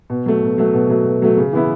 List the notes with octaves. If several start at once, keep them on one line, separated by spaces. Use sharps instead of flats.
B2
F#3 A3
B2
F#3 A3
B2
F#3 A3
B2
F#3 A3
C#3
E3 B3 E4